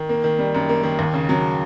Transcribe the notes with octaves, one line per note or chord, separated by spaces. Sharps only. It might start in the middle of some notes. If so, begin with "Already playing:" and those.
Already playing: D#3
A#3
D#3
G3
F#2
A#3
D#3
D#2
C#3
F#3